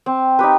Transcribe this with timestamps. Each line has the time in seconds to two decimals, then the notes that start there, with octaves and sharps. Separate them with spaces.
0.06 C4
0.39 D#4 G4 B4